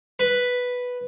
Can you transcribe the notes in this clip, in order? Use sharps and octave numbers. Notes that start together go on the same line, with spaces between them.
B4